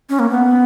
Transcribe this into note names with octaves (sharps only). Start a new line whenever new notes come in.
C#4
A#3
B3